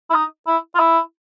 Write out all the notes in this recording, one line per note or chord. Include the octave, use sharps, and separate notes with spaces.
E4
D#4
E4
F4
E4